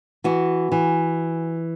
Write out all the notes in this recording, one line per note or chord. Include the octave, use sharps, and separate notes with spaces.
E3 F#4
E3